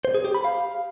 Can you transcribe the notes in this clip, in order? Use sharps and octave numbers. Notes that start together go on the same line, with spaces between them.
C5
G#4
G4
B5
F5